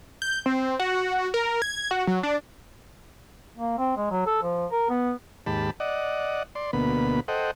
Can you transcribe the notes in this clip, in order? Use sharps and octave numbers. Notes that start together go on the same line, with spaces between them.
G6
C4
F#4
A#4
G#6
F#4
F#3
D4
A#3
C4
G#3
F#3
A4
F3
A#4
B3
D#2 G#2 G4 A5 B5
D5 D#5 F#5
D5 C6
D2 B2 A#3 B3 B5
A4 C5 D#5 F#5 G5